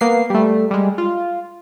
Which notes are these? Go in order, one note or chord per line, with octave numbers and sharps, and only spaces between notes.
A#3 B3 C7
G3 A3
G3 G#3
F4